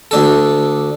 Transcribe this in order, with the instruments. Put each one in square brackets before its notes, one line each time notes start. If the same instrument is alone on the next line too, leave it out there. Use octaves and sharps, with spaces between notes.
[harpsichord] D2 D4 A4